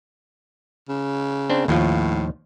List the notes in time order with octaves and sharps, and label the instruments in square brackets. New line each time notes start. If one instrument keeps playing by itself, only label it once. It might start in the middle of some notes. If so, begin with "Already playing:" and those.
[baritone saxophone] C#3
[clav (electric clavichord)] C4 D4 C5
[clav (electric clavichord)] D#2 F3 F4 [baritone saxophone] A2